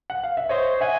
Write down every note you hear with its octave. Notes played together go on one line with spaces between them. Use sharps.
F#5
F5
E5
C5 C#5 D#5
E5 F#5 G#5